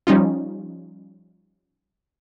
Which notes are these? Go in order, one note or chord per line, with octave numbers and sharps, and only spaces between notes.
F3 G3 C#4 D#4 F4